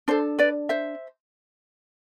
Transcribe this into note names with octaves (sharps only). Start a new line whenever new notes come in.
D4 A4 C5
B4 D5
C5 E5